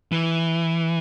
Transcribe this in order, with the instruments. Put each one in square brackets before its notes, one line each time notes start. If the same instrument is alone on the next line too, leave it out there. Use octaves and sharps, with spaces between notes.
[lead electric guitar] E3